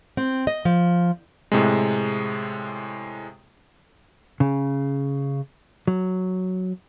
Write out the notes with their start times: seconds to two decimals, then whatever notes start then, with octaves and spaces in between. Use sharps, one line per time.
0.17 C4
0.47 D#5
0.65 F3
1.52 A2 C3 G#3
4.40 C#3
5.88 F#3